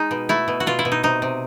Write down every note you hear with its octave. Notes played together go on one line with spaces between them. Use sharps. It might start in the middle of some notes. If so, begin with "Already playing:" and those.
Already playing: G#3 D#4
B2
A3 E4
B2
F#4
B2 F4
E4
B2
D#4
C3 D#4
C3